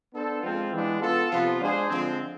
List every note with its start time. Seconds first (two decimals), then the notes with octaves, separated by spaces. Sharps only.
0.13 B3 D4 A4 C5
0.42 F3 G#3 C4 F4
0.71 E3 G#3 B3 D4
1.01 B3 F4 A4
1.31 C3 F3 B3 F4
1.61 G#3 D4 G#4 C5
1.89 D3 F3 G#3 C4